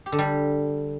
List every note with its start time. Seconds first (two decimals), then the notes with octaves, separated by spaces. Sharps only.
0.06 G4
0.12 D3
0.19 G3